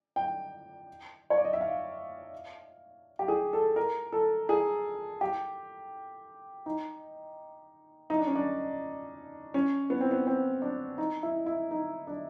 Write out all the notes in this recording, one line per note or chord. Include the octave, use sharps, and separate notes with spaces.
G5
C#5
D5
D#5
E5
F5
G4
G#4
A4
A#4
A4
G#4
G4
D#4
D#4
D4
C#4
D4
C#4
B3
C4
B3
C4
D4
D#4
E4
E4
D#4
D4